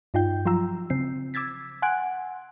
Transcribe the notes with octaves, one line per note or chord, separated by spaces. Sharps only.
G2 D#4 F4 G5 G6
F3 F#3 F4 A#5 E6
C#3 C4 C7
D6 E6 G#6 A6 B6
F#5 G#5 C6 F#6 G#6 D7